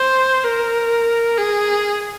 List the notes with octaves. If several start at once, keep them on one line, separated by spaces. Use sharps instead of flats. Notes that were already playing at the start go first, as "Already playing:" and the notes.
Already playing: C5
A#4
G#4